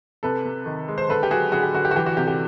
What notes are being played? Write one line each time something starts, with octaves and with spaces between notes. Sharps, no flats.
C3 A4 B4
C3
D#3
G#3
C5
D3 A4 B4
G4
F#3 F#4 G#4
D3 F#4 G#4
G4
D3 F#4
G4
F#4
E3 G4
F#4
C3 G4
G4